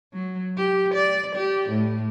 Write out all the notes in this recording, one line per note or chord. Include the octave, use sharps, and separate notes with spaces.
F#3
G4
D5
G4
A2